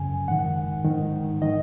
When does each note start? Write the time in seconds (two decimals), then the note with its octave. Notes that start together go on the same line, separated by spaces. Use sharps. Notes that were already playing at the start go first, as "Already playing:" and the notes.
Already playing: F#2 C#3 G#5
0.28 G#2 D#3 F#5
0.85 G#2 D#3
1.42 D#3 D#5